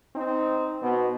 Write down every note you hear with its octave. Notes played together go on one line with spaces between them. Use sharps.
C4 D#4
B2